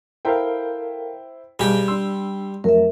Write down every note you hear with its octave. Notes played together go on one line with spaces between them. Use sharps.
E4 A4 A#4 C5 F5 G5
B1 G3 G4 G#4
D4 C6 E6
F2 F#3 A3 A#4 E5